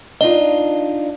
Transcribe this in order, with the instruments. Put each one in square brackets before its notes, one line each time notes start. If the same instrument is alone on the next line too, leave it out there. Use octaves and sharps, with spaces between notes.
[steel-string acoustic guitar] D4 D#4 F4 [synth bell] D#5